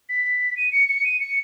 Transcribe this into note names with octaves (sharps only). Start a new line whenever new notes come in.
B6
D#7
C#7
C#7
D#7
C#7